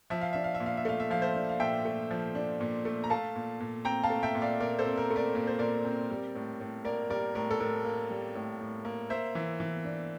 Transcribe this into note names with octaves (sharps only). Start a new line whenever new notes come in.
F3 E5
F5
D4 E5
F5
E5
A#2
F5
E5
A3 F5
E5
F3 F5
C5 E5
D4
F5
A#2 E5 G5
A3
F3
D4
A#2
A3
A#5
A3 F5 A5
A#2
A#2
C4 G5 A#5
F5 A5
A3
E5 G5
A#2
D5 F5
A#2 A#4 D5
A4 C5
C4
A#4
A3
A#4 D5
A#2 D5
C5
A#2 A#4 D5
C4
G3
A2
A2
A#3 A#4 D5
G3 A#4 D5
A2 A#4
A4
A2 A#4
A#3
G3
A2
A2
A#3
A#3 C5 E5
E3
E3
D4